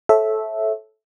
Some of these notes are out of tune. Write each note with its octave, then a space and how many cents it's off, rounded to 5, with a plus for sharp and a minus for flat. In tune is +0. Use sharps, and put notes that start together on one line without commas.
A4 -15 C#5 -30 E5 -5